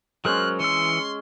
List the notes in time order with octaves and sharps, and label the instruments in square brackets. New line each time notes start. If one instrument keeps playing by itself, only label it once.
[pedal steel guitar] F#3 A#4 C5 [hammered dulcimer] G#3 C#4 [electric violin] F#6
[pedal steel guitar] E3 E6 [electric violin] C6 [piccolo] C#7